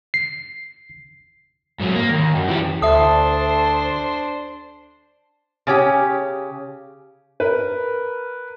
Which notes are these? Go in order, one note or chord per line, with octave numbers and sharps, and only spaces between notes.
C7
G#2 F#3
A#3
D#2
F#2
E3 G4
D2 D4 A4 C5 E5 D#6
C#3 C#4 G4
A#4 B4